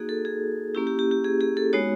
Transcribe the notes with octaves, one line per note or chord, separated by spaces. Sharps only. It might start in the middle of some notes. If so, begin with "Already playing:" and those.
Already playing: A#3 D#4 F#4 G#4
A4
G#4
A#3 C#4 E4 G4
G4
G4
G4
G#4
G#4
A4
G#3 B3 D#4 F#4 C#5